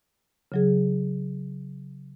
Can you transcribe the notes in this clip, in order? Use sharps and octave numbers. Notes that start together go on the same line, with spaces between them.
C#3 F#3 G#4